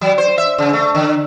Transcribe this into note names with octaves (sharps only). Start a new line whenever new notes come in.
F#3
C5
E5
C#3
A3
D3